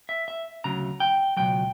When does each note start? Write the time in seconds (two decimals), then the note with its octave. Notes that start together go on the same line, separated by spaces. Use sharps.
0.09 E5
0.28 E5
0.64 D2 C#3 F#3 A#5
1.00 G5
1.37 C#2 B2 F#3 G5